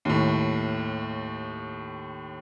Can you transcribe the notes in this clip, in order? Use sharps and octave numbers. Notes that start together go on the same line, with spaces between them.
D#2 A2